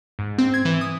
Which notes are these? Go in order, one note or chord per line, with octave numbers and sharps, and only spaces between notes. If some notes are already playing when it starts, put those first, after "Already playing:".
G#2
C4
G#6
E3
D#6